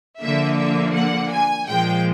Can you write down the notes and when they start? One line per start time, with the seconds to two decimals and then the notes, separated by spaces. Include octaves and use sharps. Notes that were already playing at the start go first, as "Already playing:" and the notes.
0.20 D3 F3 A#3 E5
0.57 E5
0.93 F#5
1.31 G#5
1.67 A#2 F3 G#3 G5